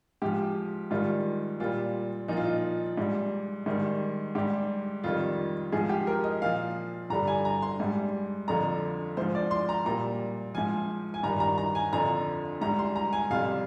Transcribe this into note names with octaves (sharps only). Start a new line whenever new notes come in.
G#2 F3 G4
G#2 D#3 G3 F4
A#2 G3 F4
A#2 F3 D#4
F4
D#4
G#2 G3
G#2 D#3 G3
G#2 G3 G4
F2 D#3 G3 F4
G#2 F3 G#4
G4
A#4
D#5
A#2 F3 F5
G2 D3 G3 A#5
G#5
A#5
C6
G#2 G3
F2 D3 F3 A#5
G#2 F3 C5
D5
C6
A#5
A#2 G3 A#5
G#2 F3 G#5
G#5
G2 D#3 G3 A#5
A#5
A#5
G#5
F2 D3 F3 A#5
G#2 G3 A#5
C6
A#5
G#5
F2 C3 G3 F5